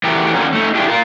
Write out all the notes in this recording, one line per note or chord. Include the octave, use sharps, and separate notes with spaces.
E3 F#3 A3 G4 A#4
D3 D#3 F#3 A#3 C#4 D#4
A3 D#4
G#3 A3 D4 E4 G4 G#4
F4 A#4